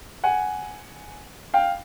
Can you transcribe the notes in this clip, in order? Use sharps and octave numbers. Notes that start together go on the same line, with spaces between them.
F#5 G#5
F5 G5